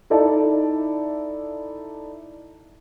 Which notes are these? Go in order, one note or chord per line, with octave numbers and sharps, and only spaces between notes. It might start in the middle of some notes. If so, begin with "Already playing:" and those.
D#4 E4 A4 D5 E5 A5